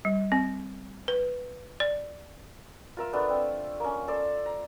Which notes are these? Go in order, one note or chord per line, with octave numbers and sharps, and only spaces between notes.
G3
C4
B4
D5
F4 A#4 E5
A3 B3 D4
C4
A#3 C#4
A4 D5 A5 C6
A#5